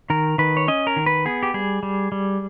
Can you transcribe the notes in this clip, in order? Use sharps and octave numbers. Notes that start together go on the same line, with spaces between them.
D#3 A#4
D#3 B4
C#5
C#4 D#5
A#4
D#3
B4
B3 G#4
G4
G3 G#4
G3
G3